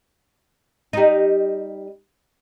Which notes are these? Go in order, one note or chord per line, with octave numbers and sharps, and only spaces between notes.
G3 D#4